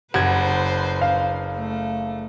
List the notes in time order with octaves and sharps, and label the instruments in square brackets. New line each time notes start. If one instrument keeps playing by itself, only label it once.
[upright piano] F#1 G#6 [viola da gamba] B4 C5 [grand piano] F#5
[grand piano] F5
[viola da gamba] A3